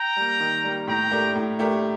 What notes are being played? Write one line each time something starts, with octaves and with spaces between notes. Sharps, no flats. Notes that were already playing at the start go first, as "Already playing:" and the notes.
Already playing: G5 A#5
G3 A#3
D#3
G3 A#3
A2 G5 A#5
A3 D4 G4 A#4
A2
A3 D4 G4 A#4